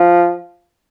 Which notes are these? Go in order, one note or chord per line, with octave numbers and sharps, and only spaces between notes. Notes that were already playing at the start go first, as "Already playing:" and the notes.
Already playing: F3